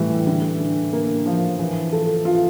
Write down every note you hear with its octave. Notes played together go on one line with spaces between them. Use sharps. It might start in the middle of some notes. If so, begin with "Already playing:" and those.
Already playing: A2 E3 G3
D3
D3
A#3
F3
E3
A4
F4